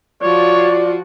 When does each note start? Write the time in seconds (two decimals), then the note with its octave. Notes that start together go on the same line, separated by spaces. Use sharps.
0.22 F3 F4 F#4 C#5 D5